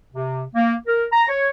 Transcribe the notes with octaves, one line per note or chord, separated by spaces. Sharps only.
C3
A#3
A#4
A#5
C#5